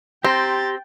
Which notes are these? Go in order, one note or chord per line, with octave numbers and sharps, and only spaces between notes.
C4 G4 G5 A#5 C6 A6